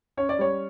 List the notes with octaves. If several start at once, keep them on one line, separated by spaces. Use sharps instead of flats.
C#4 C#5
D5
G3 C#5